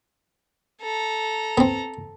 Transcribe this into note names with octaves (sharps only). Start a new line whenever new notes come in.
A4 A#5
B3 C4